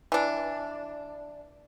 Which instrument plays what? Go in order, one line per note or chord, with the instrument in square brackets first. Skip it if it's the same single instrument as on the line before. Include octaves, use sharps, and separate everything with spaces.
[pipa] E3 D4